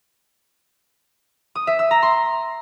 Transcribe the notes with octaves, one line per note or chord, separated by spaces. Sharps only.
D#6
E5
E6
A#5
C6